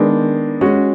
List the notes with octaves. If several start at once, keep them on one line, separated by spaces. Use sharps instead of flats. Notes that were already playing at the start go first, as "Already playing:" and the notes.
Already playing: D#3 G#3 B3 D4
G#3 C#4 F#4